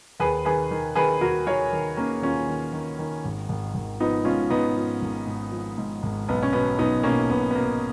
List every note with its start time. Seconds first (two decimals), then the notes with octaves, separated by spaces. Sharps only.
0.20 D#2 G#4 B4
0.45 D#3 G#4 B4
0.71 D#3
0.95 D#3 G#4 B4
1.21 D#2 F#4 A#4
1.46 D#3 A#4 C#5
1.73 D#3
1.97 D#3 A#3 C#4
2.22 D#2 C#4 F4
2.48 D#3
2.73 D#3
2.99 D#3
3.25 G#1
3.49 G#1
3.74 G#1
4.00 F3 B3 D#4
4.25 G#2 C#4 F4
4.50 G#1 B3 D#4
4.76 F3
5.02 G#1
5.27 G#2
5.51 F3
5.78 G#2
6.03 G#1
6.29 B1 B3
6.43 C#4
6.53 B2 B3
6.79 B1 B3 D#4
7.03 B2 A#3 C#4
7.30 B1 B3
7.51 B3
7.55 B2 A#3